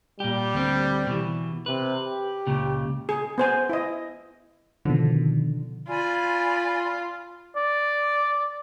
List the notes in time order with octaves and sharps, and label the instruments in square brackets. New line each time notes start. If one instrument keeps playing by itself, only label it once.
[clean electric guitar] A#2 G4 [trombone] G3
[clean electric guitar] D2 C4
B2 E3
[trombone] C3 [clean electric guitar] B4
[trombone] G4
[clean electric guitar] C#2 A#2 C#3
[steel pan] G#4
B3 C5 G#5
E4 D#5
[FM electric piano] B2 D#3 F3 [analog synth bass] D3
[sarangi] F4 [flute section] D5 G#5 B5
[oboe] D5